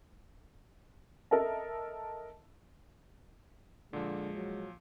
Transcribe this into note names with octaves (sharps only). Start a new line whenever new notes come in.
A4 A#4 D#5 E5 A5
A#2 D3 F3 G#3
F#3